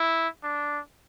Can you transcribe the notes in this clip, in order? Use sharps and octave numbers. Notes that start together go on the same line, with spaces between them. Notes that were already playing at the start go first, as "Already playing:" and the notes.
Already playing: E4
D4